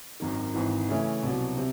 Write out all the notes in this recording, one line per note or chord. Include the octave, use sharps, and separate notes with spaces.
G#1 F#2 D#3
G#1 G#2 E3
C#3 E3 A3 C#4 E4
C2 B2 F#3
C3